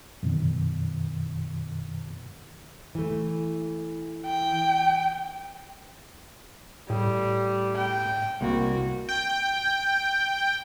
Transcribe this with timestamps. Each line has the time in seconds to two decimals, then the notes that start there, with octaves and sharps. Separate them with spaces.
0.23 F#2 B2 D#3
2.95 E3 A3
4.26 G5
6.90 A2 G3
7.77 G5
8.41 C2 A#3 F#4
9.09 G5